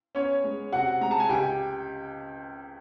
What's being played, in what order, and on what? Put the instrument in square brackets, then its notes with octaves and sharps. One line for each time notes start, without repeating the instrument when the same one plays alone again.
[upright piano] B3 C#4 C#5
G#3
C3 F#4 F#5
G#3 A#5
A5
G#5
C#2 G4 G5